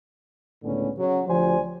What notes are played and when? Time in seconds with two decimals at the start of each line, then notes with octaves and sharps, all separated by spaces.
0.63 C#2 A2 D3 B3 C#4
0.97 C#3 F#3
1.28 D2 F3 G4 C5 D5 G#5